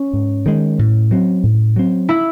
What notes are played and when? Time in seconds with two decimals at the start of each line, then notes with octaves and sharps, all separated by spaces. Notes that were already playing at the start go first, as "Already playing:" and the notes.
Already playing: C#4
0.13 G#2
0.46 D#3 G#3
0.79 A2
1.11 F#3 C4
1.43 A2
1.76 F#3 C4
2.09 E4